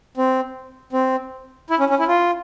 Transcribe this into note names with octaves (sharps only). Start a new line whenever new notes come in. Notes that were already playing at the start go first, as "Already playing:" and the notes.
C4
C4
E4
C#4
C#4
E4
F4